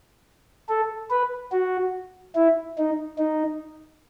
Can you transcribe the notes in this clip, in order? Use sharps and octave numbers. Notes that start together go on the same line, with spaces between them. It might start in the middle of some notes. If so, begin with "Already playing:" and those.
A4
B4
F#4
E4
D#4
D#4